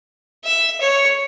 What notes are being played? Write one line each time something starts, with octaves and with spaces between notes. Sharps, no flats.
E5
C#5